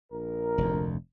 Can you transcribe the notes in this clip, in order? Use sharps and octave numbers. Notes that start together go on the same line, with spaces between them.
A#1 A#4
F1 D2